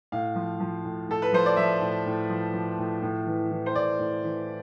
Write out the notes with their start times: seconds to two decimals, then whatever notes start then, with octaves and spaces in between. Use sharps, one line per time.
0.12 A2 F5
0.35 F3
0.60 F3
0.85 A2
1.09 A2 A4
1.22 B4
1.33 F3 C5
1.46 D5
1.56 F3 E5
1.81 A2
2.06 A2
2.29 F3
2.53 F3
2.79 A2
3.02 A2
3.26 E3
3.51 E3
3.66 C5
3.75 A2 D5
3.99 A2
4.24 E3